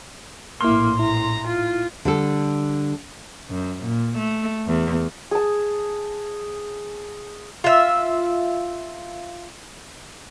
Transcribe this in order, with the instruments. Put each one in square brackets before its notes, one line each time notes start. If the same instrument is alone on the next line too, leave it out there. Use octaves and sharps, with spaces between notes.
[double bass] A#1 A2 [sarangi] A#3 [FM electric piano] E4 F6 [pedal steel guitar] C6
[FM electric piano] E4 [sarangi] A#5
[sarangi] F4
[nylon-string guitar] D3 G3 A4
[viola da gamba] F#2
A#2
A3
E2
[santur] G#4 A5
[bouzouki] F4 E5